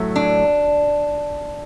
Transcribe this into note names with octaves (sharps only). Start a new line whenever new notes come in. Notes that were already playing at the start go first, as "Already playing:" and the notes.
Already playing: A2 F#3 A3
D4